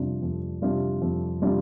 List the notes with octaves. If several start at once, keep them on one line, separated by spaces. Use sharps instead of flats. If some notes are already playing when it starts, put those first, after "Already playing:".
Already playing: F2 C3 G3 D4 F4
F2
C3 G3 D4 F4
F2
C3 G3 D4 F4